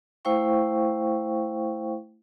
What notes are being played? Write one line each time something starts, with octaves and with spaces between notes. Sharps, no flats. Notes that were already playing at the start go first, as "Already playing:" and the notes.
A3 E4 C5 F5 G5 C#6